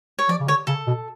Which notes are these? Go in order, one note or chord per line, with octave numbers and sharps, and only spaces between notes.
C#5
F3 D5
C#3
D3 C#5
C#3 A4
B2